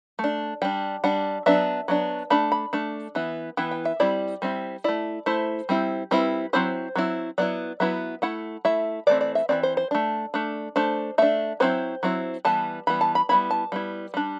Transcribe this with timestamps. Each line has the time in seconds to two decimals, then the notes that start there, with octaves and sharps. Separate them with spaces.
0.19 A3 D4
0.62 G3 D4 G5
1.04 G3 D4 F#5
1.46 F#3 B3 D4 E5
1.88 F#3 B3 D4
2.30 A3 D4 B5
2.52 B5
2.73 A3 D4
3.15 E3 B3 E4
3.57 E3 B3 E4 G5
3.71 G5
3.85 E5
4.00 G3 C4 E4 D5
4.42 G3 C4 E4
4.84 A3 E4 D5
5.26 A3 E4 C5
5.69 G3 C4 E4
6.11 G3 C4 E4 B4
6.53 F#3 C4 E4 C5
6.96 F#3 C4 E4
7.38 F#3 B3 E4 D5
7.80 F#3 B3 E4 E5
8.22 A3 E4 F#5
8.65 A3 E4 E5
9.07 E3 A3 C4 D5
9.21 D5
9.35 E5
9.49 E3 A3 C4 D5
9.63 C5
9.77 C5
9.91 A3 D4
10.34 A3 D4
10.76 A3 D4 C5
11.18 A3 D4 E5
11.60 F#3 C4 E4 C5
12.03 F#3 C4 E4
12.45 E3 G3 B3 A5
12.87 E3 G3 B3 B5
13.01 A5
13.15 B5
13.29 G3 B3 E4 B5
13.51 A5
13.72 G3 B3 E4
14.14 G3 D4